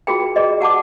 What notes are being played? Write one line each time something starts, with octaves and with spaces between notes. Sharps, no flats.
F4 F#4 G#4 G5
G#4 D5 D#5
G4 F#5 A5 D6